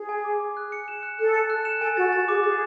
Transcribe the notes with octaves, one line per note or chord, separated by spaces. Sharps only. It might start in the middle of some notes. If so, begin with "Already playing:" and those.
Already playing: G#4
G#5
D6
D6
F#6
C#7
E7
F#6
A4 F#6
C#7
F#6
E7
A4 G#5
F#4 A6
F#4 A6
G#4 D6
G#4 A6